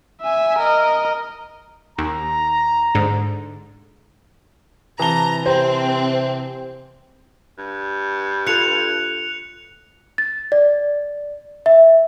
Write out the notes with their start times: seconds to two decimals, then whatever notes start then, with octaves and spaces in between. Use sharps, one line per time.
0.22 E5 G#5
0.59 A#4 D#5
1.98 D#2 A#5
2.95 G#2 D3
5.00 C3 E3 A5 A#5 G7
5.46 C3 C4 C5
7.58 G2
8.47 F4 A4 F#6 C#7 F7
10.18 A6
10.52 D5
11.66 E5